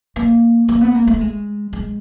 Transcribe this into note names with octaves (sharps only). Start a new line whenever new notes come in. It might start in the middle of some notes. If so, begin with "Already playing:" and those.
A#3
A#3
B3
A#3
A3
G#3
G#3